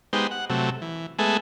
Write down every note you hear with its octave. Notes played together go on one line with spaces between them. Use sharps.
G#3 B3 D#4 G4 C5
F#5
C3 F#3 A3
E3
G#3 A3 B3 G#4 A4 E5